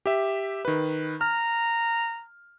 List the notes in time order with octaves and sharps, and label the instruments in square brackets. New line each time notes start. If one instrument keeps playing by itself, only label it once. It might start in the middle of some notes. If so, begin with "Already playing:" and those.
[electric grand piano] G4 E5
D#3 B4
[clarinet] A#5 [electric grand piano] F6